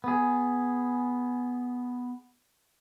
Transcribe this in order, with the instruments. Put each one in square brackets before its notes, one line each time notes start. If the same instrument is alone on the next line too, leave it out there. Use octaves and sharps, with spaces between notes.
[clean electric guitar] B3 G#4